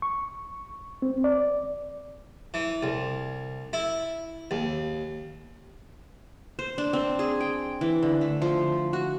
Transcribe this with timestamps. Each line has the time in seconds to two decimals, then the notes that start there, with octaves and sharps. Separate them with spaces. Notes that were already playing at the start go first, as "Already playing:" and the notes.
0.02 C#6
1.02 C4
1.24 D5
2.54 E3
2.83 C2
3.73 E4
4.51 D#2
6.59 C5
6.78 D4
6.93 C4
7.19 G#4
7.41 G5
7.81 E3
8.02 D3
8.21 A3
8.42 F3
8.93 F#4